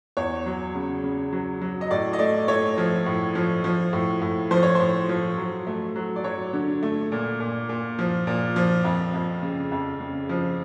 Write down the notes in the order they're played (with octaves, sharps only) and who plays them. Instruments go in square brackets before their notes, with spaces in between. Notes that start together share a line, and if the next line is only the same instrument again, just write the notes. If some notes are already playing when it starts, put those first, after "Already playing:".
[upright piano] E2 C#5
F#3
C#3
C#3
F#3
F#3
D#5
A2 D5
D#5
A3 D5
A3 C#5
F3
A2
F3
F3
A2
A2
F3 C5
C#5
A2 C5
F3
F#3
A3
F#3
D5
F#3 C#5
D3
A3
A#2
A#2
A#2
F3
A#2
F3
F2
F2
C#3
F2
C#3
F3